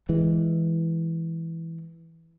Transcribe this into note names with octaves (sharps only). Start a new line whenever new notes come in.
E3 G#3